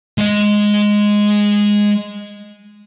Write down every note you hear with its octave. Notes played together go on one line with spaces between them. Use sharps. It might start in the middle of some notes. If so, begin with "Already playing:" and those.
G#3 D#5